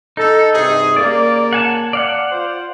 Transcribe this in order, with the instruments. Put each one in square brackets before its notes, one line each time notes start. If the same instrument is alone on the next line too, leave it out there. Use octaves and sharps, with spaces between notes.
[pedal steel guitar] D#4 [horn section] A4
[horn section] G2 C3 G#4
[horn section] C#3 A#3 [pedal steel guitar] D5
[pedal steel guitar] F#5 G#5 A5
D5 F5 F#5
[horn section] F4 C5